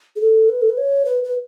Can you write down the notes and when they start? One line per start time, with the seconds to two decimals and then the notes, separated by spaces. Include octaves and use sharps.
0.16 G#4
0.21 A4
0.49 B4
0.62 A4
0.69 B4
0.78 C#5
1.05 B4
1.24 B4